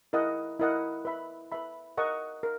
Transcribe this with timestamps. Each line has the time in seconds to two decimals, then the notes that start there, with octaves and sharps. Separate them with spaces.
0.13 E4 A#4 D#5 F#5
0.60 E4 A#4 D#5 F#5
1.05 B4 E5 B5
1.52 B4 E5 B5
1.98 A#4 D#5 F#5 A#5 C#6
2.43 A#4